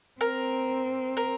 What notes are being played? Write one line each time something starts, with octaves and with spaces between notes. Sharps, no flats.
C4 A#4
A#4